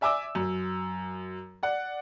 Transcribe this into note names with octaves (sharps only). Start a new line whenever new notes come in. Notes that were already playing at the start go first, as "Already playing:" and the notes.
D5 E5 G#5 D6 E6
F#2
D5 F#5